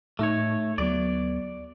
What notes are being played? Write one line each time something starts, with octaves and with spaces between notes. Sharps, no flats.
A2 A3 D#4 C#5
D2 F#3 B3 D5